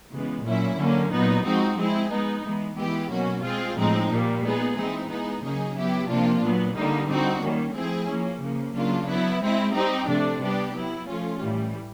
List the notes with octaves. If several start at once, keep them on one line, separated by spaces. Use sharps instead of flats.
C#3 E3 G#3 B3
A#2 F#3 A#3 C#4 E4
D3 F#3 A#3 C#4
A#2 F#3 B3 D#4
F3 G#3 C4 D#4 F#4
G#3 C4 E4 G#4
G#3 B3 D#4
E3 G#3 B3
E3 G#3 B3 E4 G4
B2 F#3 A#3 C#4 F#4
G#3 C4 F4 G#4
A2 F3 G#3 C4 D#4
A#2 G3 A#3
G#3 B3 D#4 G#4
E3 G#3 C4 D#4
G#3 B3 D#4 G#4
C#3 F#3 A#3 D#4 G#4
F#3 B3 E4 G4
C3 F3 A#3 D4 F4
A#2 F#3 B3
D3 G3 A#3 D#4
G3 C4 D#4 F#4
D#3 G3 A#3 C#4
F3 A3 C4 E4 G#4
F3 A#3 C#4
C#3 F3 A#3
C#3 F#3 A#3 D4 F4
F#3 B3 E4
G#3 C4 E4
G3 C4 D#4 G4
C3 F3 A3 D4
G3 B3 D4 G4
F#3 B3 E4
F3 A3 C#4 F4
A2 E3 G3